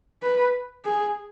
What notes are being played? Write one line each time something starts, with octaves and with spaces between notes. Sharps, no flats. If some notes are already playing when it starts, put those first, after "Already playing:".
B4
G#4